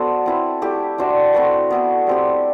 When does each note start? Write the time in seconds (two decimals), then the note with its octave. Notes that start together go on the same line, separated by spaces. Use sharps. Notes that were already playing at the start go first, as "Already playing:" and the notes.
Already playing: F#3 B3 D4 F#4 A4 C5
0.26 C4 E4 B4
0.62 A3 E4 G4
0.98 D4 F#4 C5 E5
1.34 A3 C4 F#4 B4
1.70 B3 E4 B4
2.07 G3 C4 G4